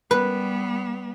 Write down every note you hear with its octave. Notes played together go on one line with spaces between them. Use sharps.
G3 B3 B4